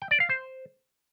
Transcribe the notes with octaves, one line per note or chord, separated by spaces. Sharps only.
G5
D5
F5
C5